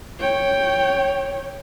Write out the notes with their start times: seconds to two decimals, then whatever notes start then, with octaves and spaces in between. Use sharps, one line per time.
0.20 C#5 G5